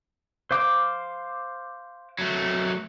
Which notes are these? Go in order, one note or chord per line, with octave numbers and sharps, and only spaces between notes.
C5 F5 D6
F#3 A3